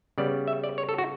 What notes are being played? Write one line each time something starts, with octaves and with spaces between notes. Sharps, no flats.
C#3 G3 B3 D5
E5
D5
C#5
A4
F#4